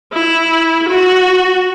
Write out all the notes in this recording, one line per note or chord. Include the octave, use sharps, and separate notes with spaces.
E4
F#4